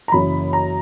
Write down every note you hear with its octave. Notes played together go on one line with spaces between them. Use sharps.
A#5
F#1 F#2 E3 B5
A#5